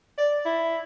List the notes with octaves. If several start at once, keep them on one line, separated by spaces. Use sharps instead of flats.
D5
E4